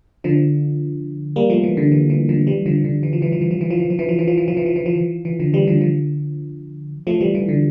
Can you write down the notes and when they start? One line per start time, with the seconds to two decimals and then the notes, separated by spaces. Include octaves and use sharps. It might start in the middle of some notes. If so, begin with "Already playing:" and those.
0.24 D3 F3
1.36 G3 A#3
1.50 F3 A3
1.63 E3
1.77 D3
1.92 E3
2.10 E3
2.29 D3 F3
2.47 E3 G3
2.66 D3 F3
2.84 D3
3.03 E3
3.13 F3
3.22 E3
3.32 F3
3.41 E3
3.51 F3
3.61 E3
3.70 F3
3.80 E3
3.90 F3
3.99 E3
4.09 F3
4.19 E3
4.28 F3
4.38 E3
4.48 F3
4.57 E3
4.66 F3
4.76 E3
4.86 F3
4.96 E3
5.25 E3
5.40 D3 F3
5.53 E3 G3
5.67 D3 F3
5.81 D3 F3
7.07 F3 A3
7.21 E3 G3
7.35 E3
7.49 D3